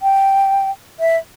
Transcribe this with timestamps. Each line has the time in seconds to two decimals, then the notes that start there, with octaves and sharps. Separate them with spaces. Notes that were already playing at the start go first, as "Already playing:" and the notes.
0.02 G5
1.00 E5